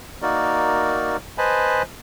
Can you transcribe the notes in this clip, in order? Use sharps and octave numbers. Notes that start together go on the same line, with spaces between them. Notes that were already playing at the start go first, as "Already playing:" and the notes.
A#3 D#4 F#4 A#4 D5
B4 C5 D#5 G#5 A5 B5